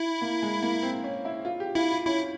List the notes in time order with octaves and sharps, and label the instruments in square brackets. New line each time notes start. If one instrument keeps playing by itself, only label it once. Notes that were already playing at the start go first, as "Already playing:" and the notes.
Already playing: [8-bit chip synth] E4
[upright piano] A#3
G#3
A#3
C4
C#4
E4
F4
G4
[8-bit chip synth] E4 [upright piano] F4
[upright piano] F4
[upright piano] C#4 [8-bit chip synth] E4